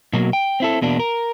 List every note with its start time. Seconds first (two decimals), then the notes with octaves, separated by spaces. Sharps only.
0.13 B2 F#3 A#3
0.33 G5
0.60 C4 E4 A4
0.81 E2 B2 A#3 D4
1.00 A#4